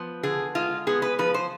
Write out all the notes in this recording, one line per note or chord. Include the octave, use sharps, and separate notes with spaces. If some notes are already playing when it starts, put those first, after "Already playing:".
Already playing: F3 B3
D3 G#4
G#3 F4
B3 G#4
B4
F3 B4
C5